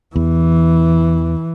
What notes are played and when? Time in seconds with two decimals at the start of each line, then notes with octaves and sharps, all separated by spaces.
0.16 E2 E3